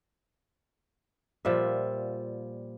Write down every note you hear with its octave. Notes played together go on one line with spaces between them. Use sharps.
A#2 F3 G3 E5